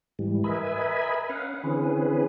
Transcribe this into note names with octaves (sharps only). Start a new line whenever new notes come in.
G#2 E3 G3
A#4 B4 D#5 E5 G#5 B5
C#4 F5 F#5
D3 E3 C4 C#4 G#4 B4